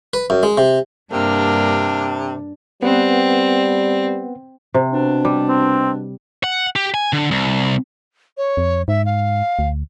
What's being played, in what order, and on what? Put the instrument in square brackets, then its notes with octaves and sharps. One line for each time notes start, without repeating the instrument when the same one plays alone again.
[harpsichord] B4
F#2
G#3
C3
[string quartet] G2 A#3 F6 [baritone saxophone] C3 [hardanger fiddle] D4
[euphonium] G3 [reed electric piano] B3 B4 F#5 [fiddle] C4
[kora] C3
[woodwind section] B2 D4
[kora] G3
[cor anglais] C4
[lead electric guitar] F#5
G4
G#5
D3
C2
[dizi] C#5
[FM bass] F2
[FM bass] G#2 [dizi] E5
[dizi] F5
[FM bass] D2